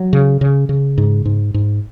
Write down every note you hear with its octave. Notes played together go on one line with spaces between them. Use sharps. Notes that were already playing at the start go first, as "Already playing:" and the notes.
Already playing: F#3
C#3
C#3
C#3
G#2
G#2
G#2